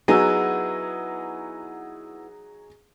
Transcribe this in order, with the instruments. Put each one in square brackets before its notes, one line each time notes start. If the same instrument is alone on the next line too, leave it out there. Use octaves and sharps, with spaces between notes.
[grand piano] F#3 D#4 [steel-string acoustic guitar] B3 E4 F#4 [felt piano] G#4 [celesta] E6 D#7